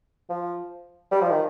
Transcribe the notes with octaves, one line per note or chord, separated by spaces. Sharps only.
F3
G3
F3
D#3